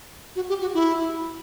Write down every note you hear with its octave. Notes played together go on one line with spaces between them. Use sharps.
F#4
G4
F#4
E4